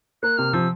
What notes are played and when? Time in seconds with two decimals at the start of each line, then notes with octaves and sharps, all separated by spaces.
0.23 A#3 F#6
0.38 C3 F6
0.53 F3 E6